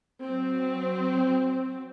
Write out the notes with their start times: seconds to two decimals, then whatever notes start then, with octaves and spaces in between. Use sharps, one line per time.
0.23 F#3 C4